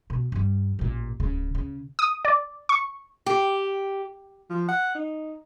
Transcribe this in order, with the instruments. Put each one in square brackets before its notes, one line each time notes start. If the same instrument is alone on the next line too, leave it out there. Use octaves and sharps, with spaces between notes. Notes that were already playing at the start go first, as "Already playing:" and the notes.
[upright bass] B2
G2 G3
A1 A#2
D1 C#3
C#3
[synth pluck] D#6
D5
C#6
[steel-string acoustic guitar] G4
[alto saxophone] F3
F#5
D#4